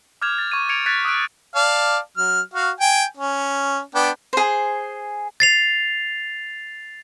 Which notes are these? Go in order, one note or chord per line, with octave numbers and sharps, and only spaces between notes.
D6 F6 G6 G#6 E7 F7
A6
C#6 G#6 D#7
G#6 C#7 D7 F7
F#6 G#6 A6 B6 D7
D#6 E6 F#6 D7
D5 F5 A5
F#3 F6
F#4 F5
G5 G#5
C#4
B3 D4 G5
G#4 C5
A6 C7 F7